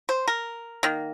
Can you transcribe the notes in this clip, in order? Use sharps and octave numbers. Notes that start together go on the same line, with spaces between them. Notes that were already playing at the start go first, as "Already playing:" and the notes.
C5
A#4
D#3 A#3